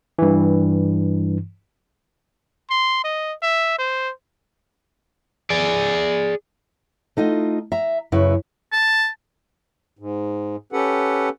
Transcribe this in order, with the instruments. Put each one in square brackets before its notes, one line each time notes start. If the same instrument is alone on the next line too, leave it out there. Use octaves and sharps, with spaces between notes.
[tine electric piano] G2 E3
[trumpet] C6
D#5
E5
C5
[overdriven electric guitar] G#4 D5
[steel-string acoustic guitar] A3 D#4 F4 D#5
E5 A#5
F#2 C#3 E4 B4 C#5
[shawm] A5
[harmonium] G#2
C#4 G4 A4 B4 F#5